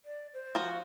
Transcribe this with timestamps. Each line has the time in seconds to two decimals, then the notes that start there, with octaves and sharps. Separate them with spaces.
0.05 D5
0.34 C5
0.55 F3 F#4